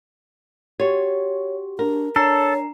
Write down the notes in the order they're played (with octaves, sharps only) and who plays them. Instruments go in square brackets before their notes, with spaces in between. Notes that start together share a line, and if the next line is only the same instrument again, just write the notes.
[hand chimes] F#4 G4 [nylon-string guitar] C#5
[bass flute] D4 [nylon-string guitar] A#4
[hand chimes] D4 A#5 C7 [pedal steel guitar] A4 [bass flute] C#5